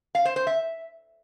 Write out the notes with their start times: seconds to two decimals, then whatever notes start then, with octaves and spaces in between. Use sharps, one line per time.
0.15 F5
0.25 C5
0.36 C5
0.47 E5